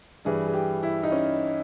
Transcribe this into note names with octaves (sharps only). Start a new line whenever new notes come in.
G2 E3 G3 G#4
G#4
G4
E4
D#4
C#4